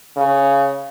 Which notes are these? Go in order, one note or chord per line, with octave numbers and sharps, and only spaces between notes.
C#3